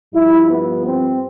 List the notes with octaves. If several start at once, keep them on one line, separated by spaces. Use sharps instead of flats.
G2 F3 E4
B3
C4